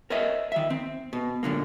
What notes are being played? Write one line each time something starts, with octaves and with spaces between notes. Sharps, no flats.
A#4 C5 C#5 D#5 E5
D#3 E5
C4
B2
F#2 A#2 D3 A#3